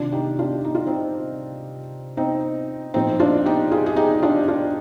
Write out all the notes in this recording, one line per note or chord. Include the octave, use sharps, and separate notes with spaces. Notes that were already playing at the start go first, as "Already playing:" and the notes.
Already playing: C3 D#3 D4 F4
D#4 G4
D4 F4
D#4
F4
C4 D#4
C4 D#4
A#2 F3 C4 D#4
D4 F4
D#4 G4
F4 G#4
G#4
D#4 G4
D4 F4
D4 F4